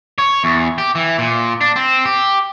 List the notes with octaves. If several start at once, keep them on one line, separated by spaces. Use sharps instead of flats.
C#5
E2
G4
E3
A#2
D4
C4
G4